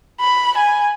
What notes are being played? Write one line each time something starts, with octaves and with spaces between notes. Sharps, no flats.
B5
G#5